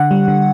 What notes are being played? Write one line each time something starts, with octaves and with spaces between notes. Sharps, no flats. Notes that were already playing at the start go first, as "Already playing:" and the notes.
Already playing: D3 F#5
G3
D3